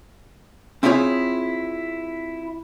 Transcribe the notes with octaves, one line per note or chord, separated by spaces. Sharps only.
C4 E4 F4 G#4 C#5